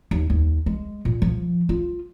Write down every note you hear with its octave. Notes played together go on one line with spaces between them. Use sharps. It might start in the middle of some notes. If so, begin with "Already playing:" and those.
D#2
D#2
G#3
A#2
F3
F4